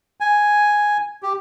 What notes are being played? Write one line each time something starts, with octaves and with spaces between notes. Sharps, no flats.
G#5
G4